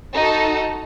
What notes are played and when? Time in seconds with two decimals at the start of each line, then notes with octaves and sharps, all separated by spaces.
0.15 D#4 F#4 A4